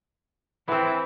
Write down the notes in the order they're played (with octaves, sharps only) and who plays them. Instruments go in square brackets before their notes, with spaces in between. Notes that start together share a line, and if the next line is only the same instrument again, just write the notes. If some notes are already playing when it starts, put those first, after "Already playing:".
[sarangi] E3 [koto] B3 C4